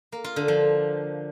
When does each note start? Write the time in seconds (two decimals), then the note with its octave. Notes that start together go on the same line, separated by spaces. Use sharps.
0.12 A#3
0.24 F4
0.36 D3
0.48 F3